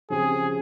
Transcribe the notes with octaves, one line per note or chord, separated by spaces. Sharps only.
C#3 F3 C4 G4 G#4